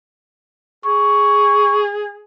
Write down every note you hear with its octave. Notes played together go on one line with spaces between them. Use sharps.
G#4 C#6